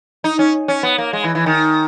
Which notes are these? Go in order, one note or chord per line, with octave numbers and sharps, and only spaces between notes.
D#4
C#4
C#4
B3
A#3
G#3
E3
E3
D#3